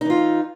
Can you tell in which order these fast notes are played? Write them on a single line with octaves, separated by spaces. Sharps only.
D#4 E3 F4